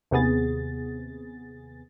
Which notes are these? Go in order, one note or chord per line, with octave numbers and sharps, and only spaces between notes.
D#2 C3 B3 G#4 A6